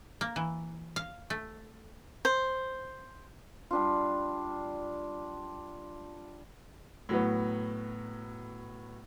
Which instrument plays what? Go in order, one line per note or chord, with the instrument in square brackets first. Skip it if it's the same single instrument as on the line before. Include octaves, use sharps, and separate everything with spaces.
[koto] A#3
E3
F5
A3
[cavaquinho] C5
[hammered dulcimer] G3 D4 F4
[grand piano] A2 F#3 B3